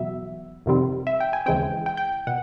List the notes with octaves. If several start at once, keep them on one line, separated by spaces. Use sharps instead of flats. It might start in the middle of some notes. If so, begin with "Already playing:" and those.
Already playing: E2 B2 F#3 B3 E5
F2 C3 D#3 G3 C4
E5
G5
G#5
D#2 C#3 E3 G#3 C4 G5
G5
G5
B2 F#5